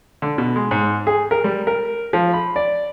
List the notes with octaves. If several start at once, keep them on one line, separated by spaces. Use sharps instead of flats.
D3
B2
G#3
G#2
G#4
A#4
G3
A#4
F3
B5
D5